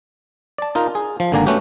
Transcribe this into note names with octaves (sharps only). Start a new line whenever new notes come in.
D5 A5
D#4 F4 A#4
G#4
F3
G#1 D3 A#3 D5 G#5 A#5
A3 B3 C#4 F#4 G4